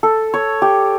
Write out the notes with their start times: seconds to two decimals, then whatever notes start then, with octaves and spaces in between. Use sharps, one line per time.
0.03 A4
0.34 C#5
0.62 G4